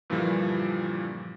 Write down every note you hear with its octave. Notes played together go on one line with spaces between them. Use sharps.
G2 A#2 D3 E3 F3 G3